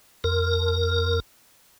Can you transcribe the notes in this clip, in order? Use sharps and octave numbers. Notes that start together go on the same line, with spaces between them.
F2 A#4